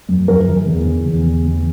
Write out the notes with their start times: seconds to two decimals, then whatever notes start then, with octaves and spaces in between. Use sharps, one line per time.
0.09 F#2
0.28 F#2 A#4
0.48 E3
0.67 E2
0.87 E3
1.06 E2
1.26 E2
1.45 E2